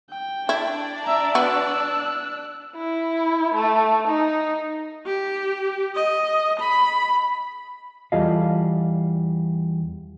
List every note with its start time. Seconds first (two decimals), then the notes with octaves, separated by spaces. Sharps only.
0.10 G5
0.49 D4 E4 D5
1.04 E5 A#5
1.35 B3 F#4 E6 F#6
2.76 E4
3.54 A3
4.07 D#4
5.06 G4
5.95 D#5
6.59 B5
8.12 E2 G3 F4 A4 D#5 F5